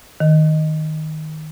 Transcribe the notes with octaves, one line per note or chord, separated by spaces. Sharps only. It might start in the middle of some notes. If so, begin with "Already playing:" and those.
D#3